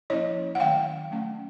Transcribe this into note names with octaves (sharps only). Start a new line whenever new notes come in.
F3 A#3 C#4 E4 C#5 D#5
F#5
D#3 F#3 A3 C#4 F5 G5
F#3 A3 C#4